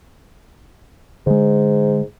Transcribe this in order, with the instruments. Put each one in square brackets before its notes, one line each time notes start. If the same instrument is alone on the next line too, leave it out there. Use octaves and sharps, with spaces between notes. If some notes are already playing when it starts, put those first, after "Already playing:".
[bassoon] G#2 [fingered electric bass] D3 G#3